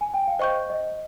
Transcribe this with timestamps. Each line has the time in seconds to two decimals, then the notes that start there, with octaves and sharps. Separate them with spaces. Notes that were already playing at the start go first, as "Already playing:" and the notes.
0.01 G#5
0.14 G5
0.27 F5
0.39 C5 D#5 G5 C#6 G6
0.70 D#5